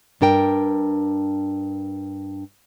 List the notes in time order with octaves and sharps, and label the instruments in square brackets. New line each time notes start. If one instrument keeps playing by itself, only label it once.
[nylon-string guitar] G2 D4 A#4 G5